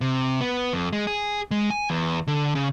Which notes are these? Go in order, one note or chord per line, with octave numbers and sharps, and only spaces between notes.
C3
B3
F2
G#3
G#4
G#3
G#5
E2
D3
C#3